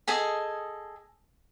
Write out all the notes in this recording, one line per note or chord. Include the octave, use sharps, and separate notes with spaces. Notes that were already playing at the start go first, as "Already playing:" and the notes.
G#4 A4 D#5 G#5